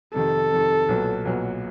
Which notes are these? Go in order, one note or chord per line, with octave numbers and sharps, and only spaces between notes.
F2 C3 D#3 A4
F2 C3 D#3
B1 A#2 F#3 B3
B1 A#2 F#3 B3